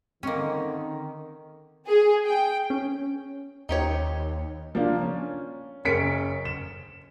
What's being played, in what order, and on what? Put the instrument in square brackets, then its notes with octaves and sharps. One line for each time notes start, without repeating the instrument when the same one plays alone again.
[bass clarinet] D3 [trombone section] D#3 [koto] A#3 C#4 [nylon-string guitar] C4 D#4 D#5
[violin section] G#4
G5
[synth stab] C#4
[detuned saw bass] D#2 [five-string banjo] D#4 G4 C#5
[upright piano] F3 A#3 D4 F4
C#4
F#1 C#4 A#4 B6 C#7 D7
E7